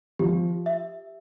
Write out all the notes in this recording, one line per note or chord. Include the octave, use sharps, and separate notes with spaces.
F3 G4
E5